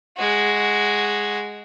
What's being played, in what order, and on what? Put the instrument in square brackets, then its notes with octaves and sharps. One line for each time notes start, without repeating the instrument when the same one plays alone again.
[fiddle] G#3 F#4